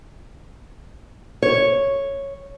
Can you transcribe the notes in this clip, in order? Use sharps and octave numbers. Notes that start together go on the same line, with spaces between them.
C#5